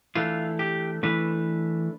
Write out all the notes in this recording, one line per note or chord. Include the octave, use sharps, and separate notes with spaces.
E3 A3 D4 F4
G4
E3 A3 D4 B4